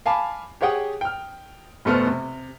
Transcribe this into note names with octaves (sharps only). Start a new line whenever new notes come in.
F5 G#5 A5 B5 D6
G4 G#4 C#5 F#5 G5 D#6
G5 F6
F1 B2 A3 B3 C5 F6
C3